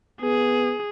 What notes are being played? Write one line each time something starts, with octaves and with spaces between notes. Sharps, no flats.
B3 G#4